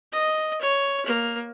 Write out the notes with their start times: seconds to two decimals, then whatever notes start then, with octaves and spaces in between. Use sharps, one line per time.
0.12 D#5
0.61 C#5
1.06 A#3